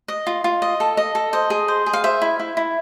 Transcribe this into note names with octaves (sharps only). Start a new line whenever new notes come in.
D#5
F4
F4
D#5
A4
D#5
A4
C5 D#5
G#4
C5
G#4
F5
C5 E5
E4
E4
E4